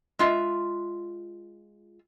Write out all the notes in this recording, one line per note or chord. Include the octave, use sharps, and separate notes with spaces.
G#3 F4 E5